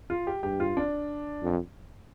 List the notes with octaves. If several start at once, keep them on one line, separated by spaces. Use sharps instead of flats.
F4
G4
G2 G4
F4
D4
F2